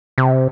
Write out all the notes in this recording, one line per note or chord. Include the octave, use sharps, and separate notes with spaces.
C3